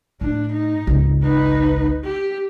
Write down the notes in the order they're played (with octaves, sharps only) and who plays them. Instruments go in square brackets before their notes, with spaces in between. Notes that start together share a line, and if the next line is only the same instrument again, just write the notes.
[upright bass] A2 [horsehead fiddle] D4
[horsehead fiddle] D#4
[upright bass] G#1 C#2
[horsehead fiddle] D#4 B4
G4